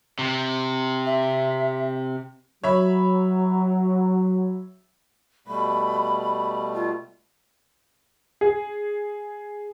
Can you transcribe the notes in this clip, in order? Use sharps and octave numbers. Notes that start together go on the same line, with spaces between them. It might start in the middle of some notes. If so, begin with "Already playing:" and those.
C3
E5
F#3 C#5 E5 B5
B2 G3 A3 B5
F4
G#4